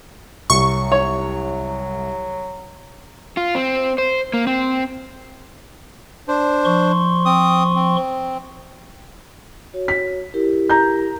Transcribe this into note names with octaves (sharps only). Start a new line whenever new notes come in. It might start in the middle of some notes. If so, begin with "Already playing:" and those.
C2 F#3 C#6
C#5
F4
C4
C5
A#3
C4
D4 C5
F3 C6 C#6
C4 D#6
C4
F#4 C#5
B6
E4 G4 A#4
A#5 G6